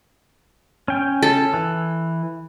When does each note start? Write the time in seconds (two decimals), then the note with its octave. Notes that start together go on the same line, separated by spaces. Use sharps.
0.88 C#4 G5
1.22 A4
1.54 E3